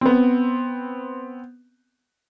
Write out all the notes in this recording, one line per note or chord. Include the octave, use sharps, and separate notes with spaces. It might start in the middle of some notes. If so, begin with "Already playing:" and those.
B3 C4